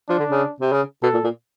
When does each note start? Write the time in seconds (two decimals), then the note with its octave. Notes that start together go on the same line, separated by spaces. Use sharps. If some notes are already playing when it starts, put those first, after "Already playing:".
0.08 F3 D4
0.19 D3
0.30 C#3
0.60 C3
0.72 C#3
1.03 B2 A4
1.14 A#2
1.24 A#2